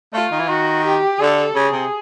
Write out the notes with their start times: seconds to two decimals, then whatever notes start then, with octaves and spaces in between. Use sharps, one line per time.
0.14 A3 F4
0.32 D#3
0.39 E3
0.48 D#3 F#4
0.85 G4
1.20 D3 A4
1.55 C#3 G#4
1.73 C3